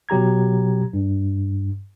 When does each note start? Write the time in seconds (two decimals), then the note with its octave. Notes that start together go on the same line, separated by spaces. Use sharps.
0.09 B2 F#3 G4 A#5 G#6
0.93 G2